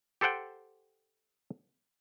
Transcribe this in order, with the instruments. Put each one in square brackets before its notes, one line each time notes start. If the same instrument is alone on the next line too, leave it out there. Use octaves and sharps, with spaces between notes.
[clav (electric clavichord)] G4 A4 C5 F#5 G5